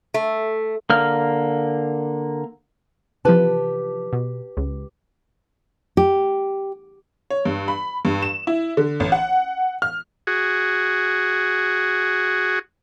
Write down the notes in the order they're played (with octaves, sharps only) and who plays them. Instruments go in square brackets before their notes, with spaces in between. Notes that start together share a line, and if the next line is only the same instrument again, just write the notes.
[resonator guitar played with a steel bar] A3
[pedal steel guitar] D3 A#3 F6
[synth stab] C3 E3 F3 [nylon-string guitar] G4 B4 A5
[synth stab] B2
C#2
[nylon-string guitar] G4
[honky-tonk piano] C#5
G2
B5
G2
E7
E4
D3
A1
F#5
F6
[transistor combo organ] F#4 G#4